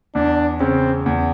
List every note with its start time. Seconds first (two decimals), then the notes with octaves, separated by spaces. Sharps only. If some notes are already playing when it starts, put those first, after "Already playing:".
0.15 E2 D4
0.60 C#3 C4
1.06 E2